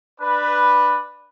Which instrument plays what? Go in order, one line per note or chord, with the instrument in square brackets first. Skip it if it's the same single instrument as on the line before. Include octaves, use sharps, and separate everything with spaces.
[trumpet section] D4 B4